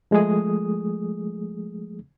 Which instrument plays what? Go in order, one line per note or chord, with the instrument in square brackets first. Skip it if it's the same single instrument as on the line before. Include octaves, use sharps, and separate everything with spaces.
[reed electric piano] F3 G#3 A3 G#4 D#6